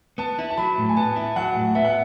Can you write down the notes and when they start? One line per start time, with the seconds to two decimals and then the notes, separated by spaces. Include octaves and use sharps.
0.18 B3 A5
0.39 E4
0.50 A5
0.58 F#3 B5
0.78 A2
0.89 G#5
0.96 B3 A5
1.16 E4
1.36 F#3 F#5
1.55 A2
1.75 B3 E5
1.85 F#5